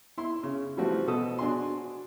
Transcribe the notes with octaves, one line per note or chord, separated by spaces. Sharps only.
E4 C6
C#3
E3 F3 G3 A3 C4 F#4
B2 A4 D#6
D4 F#4 G#4 C6